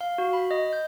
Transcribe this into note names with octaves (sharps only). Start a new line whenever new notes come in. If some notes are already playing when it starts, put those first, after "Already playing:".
F5
F#4
B5
D#5
G6